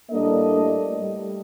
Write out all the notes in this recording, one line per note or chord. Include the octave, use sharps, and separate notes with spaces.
A2 G3 A#3 D4 A4 D#5
A3
G3